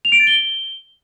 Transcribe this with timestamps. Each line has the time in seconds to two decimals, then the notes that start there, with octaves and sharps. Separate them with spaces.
0.05 F7
0.12 D7
0.20 A6
0.27 G7